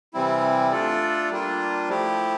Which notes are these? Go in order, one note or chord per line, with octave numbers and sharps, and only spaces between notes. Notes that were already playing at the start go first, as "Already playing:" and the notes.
C3 E3 G3 C4 E4
A3 D4 F4 A4 D5
G3 A#3 D4 F4
F3 A3 E4 G4